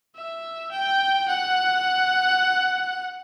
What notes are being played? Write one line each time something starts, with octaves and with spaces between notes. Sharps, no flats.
E5
G5
F#5